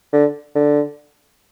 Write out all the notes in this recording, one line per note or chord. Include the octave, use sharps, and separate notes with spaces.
D3
D3